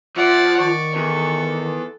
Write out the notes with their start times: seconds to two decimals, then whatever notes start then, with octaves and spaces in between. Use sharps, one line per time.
0.16 F3 D5 E5 F#5
0.59 D#3 D5 C#6
0.95 E2 A4